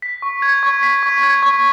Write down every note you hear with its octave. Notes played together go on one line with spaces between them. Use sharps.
B6
C#6
G#6
C#6
B6
C#6
G#6
C#6